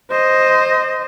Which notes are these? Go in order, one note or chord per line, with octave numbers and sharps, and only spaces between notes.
C5 D#5